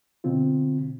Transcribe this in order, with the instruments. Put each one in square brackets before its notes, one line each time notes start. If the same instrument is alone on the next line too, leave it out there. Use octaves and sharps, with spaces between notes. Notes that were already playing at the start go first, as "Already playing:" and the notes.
[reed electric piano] B2 D3 C4 F4